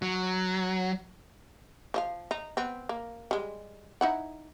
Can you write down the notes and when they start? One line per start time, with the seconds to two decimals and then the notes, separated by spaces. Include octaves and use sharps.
0.02 F#3
1.94 F3 D#5 F5
2.31 D#4
2.57 B3 C4
2.89 A#3
3.31 G3 G#3
4.01 D#4 E4 F#5